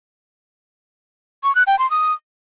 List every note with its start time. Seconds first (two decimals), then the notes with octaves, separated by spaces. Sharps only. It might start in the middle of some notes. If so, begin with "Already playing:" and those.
1.44 C#6
1.55 F#6
1.67 G5
1.79 C6
1.91 D#6